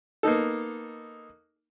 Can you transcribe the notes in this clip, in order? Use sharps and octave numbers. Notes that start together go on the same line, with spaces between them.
A#3 B3 D#4 A4